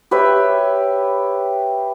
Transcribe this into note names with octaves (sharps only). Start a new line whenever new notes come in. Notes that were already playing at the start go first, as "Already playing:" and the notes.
G4 B4 C#5 E5